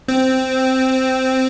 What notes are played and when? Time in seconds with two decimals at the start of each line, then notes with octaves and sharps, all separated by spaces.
0.08 C4